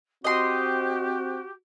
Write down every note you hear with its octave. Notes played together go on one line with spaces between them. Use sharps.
C4 F#4 G4 D#5 C6